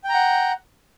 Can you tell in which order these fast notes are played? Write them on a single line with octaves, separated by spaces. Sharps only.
G5 A#5 F#5